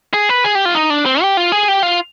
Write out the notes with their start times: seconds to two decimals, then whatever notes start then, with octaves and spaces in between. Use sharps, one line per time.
0.14 G#4
0.29 B4
0.44 G#4
0.55 G4
0.65 F4
0.75 D#4
0.90 D4
1.06 C4
1.22 G4
1.37 F4
1.52 G#4
1.68 G4
1.83 F4